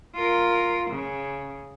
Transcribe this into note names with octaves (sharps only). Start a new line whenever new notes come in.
F4 A#4
C#3